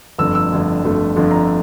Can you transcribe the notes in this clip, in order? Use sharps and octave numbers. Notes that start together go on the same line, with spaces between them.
G1 F2 D3 A3 E6
E6
G1 F2 D3 A3
G1 F2 D3 A3
G1 F2 D3 A3
A#5